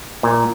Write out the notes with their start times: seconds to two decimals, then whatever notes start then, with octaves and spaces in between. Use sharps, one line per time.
0.23 A#2